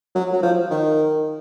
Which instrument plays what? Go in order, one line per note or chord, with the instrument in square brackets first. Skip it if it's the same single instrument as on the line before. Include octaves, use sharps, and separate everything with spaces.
[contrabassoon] F#3
F#3
F3
D#3